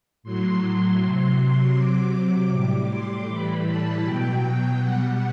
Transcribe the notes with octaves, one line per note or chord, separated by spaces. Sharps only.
A2 F#3 C6
C3 F#3
C3 F#3 D6
A2 G3 D6
C6
A2 E3 G3 B5
A5
B2 F#3 G5
B2 G3 F#5